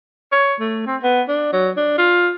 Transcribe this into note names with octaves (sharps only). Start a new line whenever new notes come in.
C#5
A3
C4
B3
D4
F#3
D4
F4